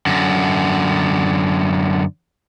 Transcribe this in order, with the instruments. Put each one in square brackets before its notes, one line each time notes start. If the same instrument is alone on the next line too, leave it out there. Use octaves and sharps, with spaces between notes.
[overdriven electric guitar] F#2 D3